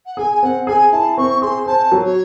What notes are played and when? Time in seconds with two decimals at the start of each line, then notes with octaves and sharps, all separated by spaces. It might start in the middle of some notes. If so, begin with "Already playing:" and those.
0.06 F#5
0.17 G#4 G#5
0.32 G#5
0.43 C4 F#5
0.67 G#4 G#5
0.92 E4 A5
1.17 C4 C#6
1.42 G#4 C6
1.66 C5 A5
1.92 F#3
2.04 C#5